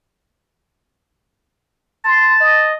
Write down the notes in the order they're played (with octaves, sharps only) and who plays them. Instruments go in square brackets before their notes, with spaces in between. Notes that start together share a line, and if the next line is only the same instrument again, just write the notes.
[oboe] A5 [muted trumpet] C6
[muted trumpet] D#5